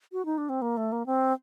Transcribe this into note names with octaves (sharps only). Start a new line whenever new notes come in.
F#4
D#4
D4
C4
A#3
A3
A#3
C4